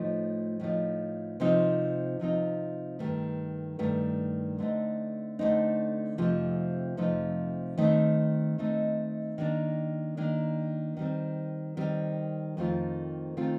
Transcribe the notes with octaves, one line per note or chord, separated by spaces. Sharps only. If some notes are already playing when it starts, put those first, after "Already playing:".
Already playing: A2 F3 A3 D#4
A2 F3 A3 D#4
C3 F3 C4 D#4
C3 F3 C4 D#4
G2 D#3 A3
G2 D#3 A3
D3 A3 C4 D#4
D3 A3 C4 D#4
F2 C3 F3 A3 D#4
F2 C3 F3 A3 D#4
D#3 A3 C4 D#4
D#3 A3 C4 D#4
D#3 A#3 D4
D#3 A#3 D4
D#3 G3 C4
D#3 G3 C4
F2 D#3 A3 C4 F4
D#3 A3 C4 F4